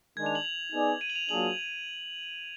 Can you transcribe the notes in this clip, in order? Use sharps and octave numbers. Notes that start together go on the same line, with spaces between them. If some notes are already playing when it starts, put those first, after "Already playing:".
D#3 G#3 D4 G#6
F7
F#7
F7
B3 D#4 G#4 D5
D#7
F#7
F7
F#3 A#3 D4 F4 G#4 F#7